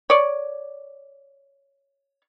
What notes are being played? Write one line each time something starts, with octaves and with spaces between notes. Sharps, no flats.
C#5 D5